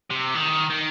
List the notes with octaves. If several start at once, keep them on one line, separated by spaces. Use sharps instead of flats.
C3
D#3
D#3